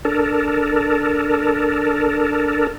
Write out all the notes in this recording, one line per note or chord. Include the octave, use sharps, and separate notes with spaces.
D4 A4 A#4